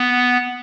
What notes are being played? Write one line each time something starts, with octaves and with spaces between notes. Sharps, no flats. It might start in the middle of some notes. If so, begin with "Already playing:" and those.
Already playing: B3